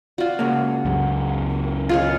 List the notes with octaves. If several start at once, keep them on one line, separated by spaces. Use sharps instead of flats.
F4 F#4 D5
C#3 G#3 A#3 F#5
C#2 F#2
A#4
F4 G#4 C#5 D#5